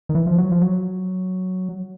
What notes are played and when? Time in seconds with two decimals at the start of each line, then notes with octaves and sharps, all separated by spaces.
0.09 D#3
0.15 E3
0.27 F3
0.38 F#3
0.52 F3
0.62 F#3